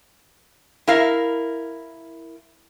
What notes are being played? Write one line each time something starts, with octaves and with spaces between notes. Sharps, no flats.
E4 A#4 F5